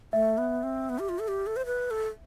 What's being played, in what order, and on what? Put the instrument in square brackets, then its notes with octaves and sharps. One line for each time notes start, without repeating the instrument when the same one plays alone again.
[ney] A3 [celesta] E5
[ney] B3
C4
B3
G4
F4
A4
G4
A4
C5
B4
A4